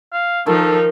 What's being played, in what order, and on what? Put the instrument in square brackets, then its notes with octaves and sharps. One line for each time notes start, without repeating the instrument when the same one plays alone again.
[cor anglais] F5
[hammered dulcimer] D#3 [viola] F3 D#4 [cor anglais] A4